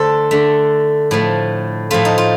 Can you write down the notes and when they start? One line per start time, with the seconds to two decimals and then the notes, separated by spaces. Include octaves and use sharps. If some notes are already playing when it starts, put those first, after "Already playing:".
Already playing: D3 A3 A4 C5
0.31 D3 A3
1.11 A2 F3 A3
1.90 A2 F3 A3 F4
2.05 D#4
2.18 F4